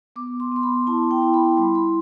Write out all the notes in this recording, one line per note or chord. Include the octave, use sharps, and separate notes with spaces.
B3 D6
C6
B3 C6
B5
E4 A5
G5
E4
B5
G3 C6
B5